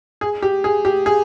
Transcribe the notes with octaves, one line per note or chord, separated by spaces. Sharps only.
G#4
G4
G#4
G4
G#4